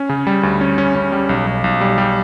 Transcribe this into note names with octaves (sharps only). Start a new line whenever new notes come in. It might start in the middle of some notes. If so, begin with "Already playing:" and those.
Already playing: C#4
C#3
G3
D2
C#4
C#4
C#4
G3
B1
B1
B1
G3
G3